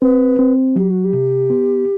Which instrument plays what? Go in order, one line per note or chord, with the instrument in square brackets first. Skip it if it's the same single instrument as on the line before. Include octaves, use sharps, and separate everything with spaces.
[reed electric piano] C4 [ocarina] B4
[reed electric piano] C4
[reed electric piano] F#3 [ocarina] G4
[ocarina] F#4
G4
[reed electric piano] C3
B3